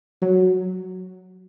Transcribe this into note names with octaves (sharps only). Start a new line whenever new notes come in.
F#3